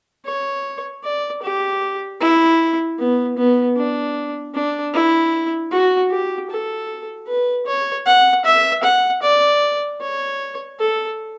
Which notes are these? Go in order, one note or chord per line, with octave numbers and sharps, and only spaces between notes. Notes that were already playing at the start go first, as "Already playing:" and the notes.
C#5
D5
G4
E4
B3
B3
D4
D4
E4
F#4
G4
A4
B4
C#5
F#5
E5
F#5
D5
C#5
A4